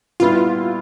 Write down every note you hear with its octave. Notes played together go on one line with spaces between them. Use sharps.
A#2 G3 B3 E4 F4